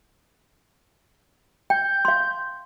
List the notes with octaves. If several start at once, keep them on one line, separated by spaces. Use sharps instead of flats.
G5 G6
F5 C6